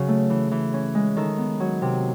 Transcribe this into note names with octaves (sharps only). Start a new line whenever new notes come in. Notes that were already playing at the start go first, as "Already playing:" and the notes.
Already playing: C#3 F#3 C#4
A3
E3
E3
C#4
G#3
D#3 A4
B3
F#3
C3